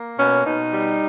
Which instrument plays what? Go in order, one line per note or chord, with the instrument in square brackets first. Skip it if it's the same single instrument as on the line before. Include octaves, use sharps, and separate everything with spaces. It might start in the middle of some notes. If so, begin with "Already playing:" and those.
Already playing: [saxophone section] A#3
B2 C#4
B2 D#4
G3